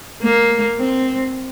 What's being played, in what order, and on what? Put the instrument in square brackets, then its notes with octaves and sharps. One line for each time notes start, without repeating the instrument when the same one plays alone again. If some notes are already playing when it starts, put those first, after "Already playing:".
[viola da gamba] A#3
C4